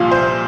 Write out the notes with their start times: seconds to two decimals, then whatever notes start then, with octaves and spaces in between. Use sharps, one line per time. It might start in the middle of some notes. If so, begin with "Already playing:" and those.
Already playing: C2 A#2 F3 F5
0.11 C5